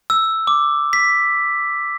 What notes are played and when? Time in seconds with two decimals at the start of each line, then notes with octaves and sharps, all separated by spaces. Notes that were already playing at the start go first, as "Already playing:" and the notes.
0.10 E6
0.47 D6
0.93 B6